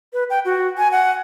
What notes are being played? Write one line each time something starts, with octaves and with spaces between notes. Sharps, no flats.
B4
G5
F#4
G#5
F#5